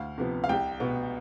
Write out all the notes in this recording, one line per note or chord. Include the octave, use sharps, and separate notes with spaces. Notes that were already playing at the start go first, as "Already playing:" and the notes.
Already playing: D2 F5
C3 F3 B3
F5
C2 G5
B2 B3